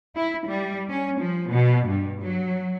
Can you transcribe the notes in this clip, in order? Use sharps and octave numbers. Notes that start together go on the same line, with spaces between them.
E4
G3
C#4
F3
B2
G2
F#3